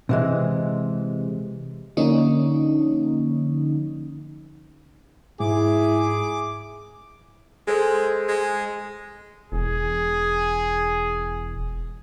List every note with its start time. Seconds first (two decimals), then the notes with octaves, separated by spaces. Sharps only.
0.09 C3 E3 G#3
1.97 D3 F3 A#3 C#4 D#4
5.40 G#2 E4 G#4 D6
7.67 G#3 G#4 A4 C5
8.28 G#3
9.52 E1 G#4